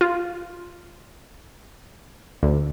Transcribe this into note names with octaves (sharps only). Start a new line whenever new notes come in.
F4
D2